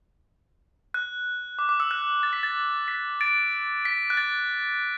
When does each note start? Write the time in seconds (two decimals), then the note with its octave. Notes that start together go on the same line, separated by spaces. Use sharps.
0.94 F#6
1.59 D6
1.69 D6
1.80 E6
1.91 F#6
2.23 A6
2.33 B6
2.43 A6
2.88 B6
3.21 A6 D7
3.85 B6
4.10 F#6
4.17 A6